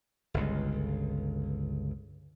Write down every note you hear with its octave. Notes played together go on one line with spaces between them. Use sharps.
G1 C#2